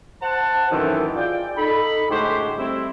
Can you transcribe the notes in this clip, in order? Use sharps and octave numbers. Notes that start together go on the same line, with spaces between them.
C5 F#5 A5
F#2 A2 D#3 E3 A3 C4
F4 G#4 D5 G5
D#4 A4 B5
A2 D3 G#3 F#4 G4 C5
G3 A3 C4 E4